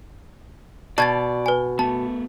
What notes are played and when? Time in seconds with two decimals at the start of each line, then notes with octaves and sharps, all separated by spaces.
0.98 B2 D5 A5 G#6 A6
1.46 B4 G#5
1.79 A3 B3 A5